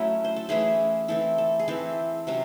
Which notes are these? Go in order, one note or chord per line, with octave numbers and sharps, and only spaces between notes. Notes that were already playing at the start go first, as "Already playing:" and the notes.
Already playing: F#3 A3 C#4 E4
C5
A4
E3 A3 C#4 E4 G#4
E3 C4 E4 A4
A4
G#4
E3 C4 E4 A4
C3 F#3 C#4